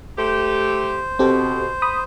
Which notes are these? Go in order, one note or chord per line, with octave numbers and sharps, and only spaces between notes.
A3 G4 C5
B2 C4 G4 A4
B5 D#6